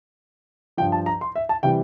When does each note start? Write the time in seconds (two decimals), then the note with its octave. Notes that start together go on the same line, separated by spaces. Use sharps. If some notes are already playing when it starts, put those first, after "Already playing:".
0.77 G2 F3 G5
0.92 A5
1.06 A#5
1.21 C6
1.36 E5
1.49 A5
1.63 C3 E3 G3 G5